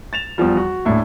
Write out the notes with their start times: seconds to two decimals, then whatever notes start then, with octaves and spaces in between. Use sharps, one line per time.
0.13 A6 E7 F7
0.38 E2 F3 G3
0.57 F#4
0.85 D#1 A2 D4 E4 E5